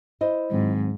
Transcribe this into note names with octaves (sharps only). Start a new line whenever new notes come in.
E4 C5 D#5
G#2 D#3 F#3 C4